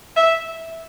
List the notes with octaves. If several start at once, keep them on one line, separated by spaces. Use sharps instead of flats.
E5